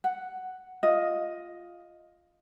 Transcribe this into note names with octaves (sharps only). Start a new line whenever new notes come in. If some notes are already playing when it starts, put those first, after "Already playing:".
F#5
F4 D#5